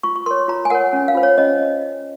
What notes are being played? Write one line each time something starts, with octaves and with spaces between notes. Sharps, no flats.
F4 C#6
C#6
A#4 C#5 C6
F4 A#5
G#5
A#4 C#5 F#5
C#4
F5
F4 C5
C#5
C#4 D#5